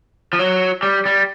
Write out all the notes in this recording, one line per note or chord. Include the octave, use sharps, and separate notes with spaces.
F3
F#3
G3
G3